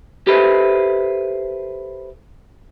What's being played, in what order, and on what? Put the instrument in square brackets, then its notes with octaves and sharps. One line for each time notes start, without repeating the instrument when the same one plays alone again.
[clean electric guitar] G4 A4 B4 C5 E5